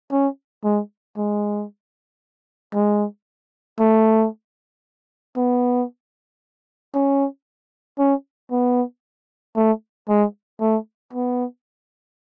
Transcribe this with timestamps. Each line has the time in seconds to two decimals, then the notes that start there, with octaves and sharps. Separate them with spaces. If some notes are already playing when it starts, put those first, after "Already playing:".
0.12 C#4
0.64 G#3
1.17 G#3
2.74 G#3
3.79 A3
5.37 B3
6.94 C#4
7.98 C#4
8.51 B3
9.56 A3
10.08 G#3
10.61 A3
11.13 B3